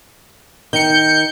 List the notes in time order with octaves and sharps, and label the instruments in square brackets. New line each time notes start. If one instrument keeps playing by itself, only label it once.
[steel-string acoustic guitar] D#3 [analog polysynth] G6 C#7